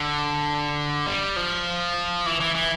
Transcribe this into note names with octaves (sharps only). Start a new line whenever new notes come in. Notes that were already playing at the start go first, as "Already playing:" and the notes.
Already playing: D3
G3
F3
E3
E3
E3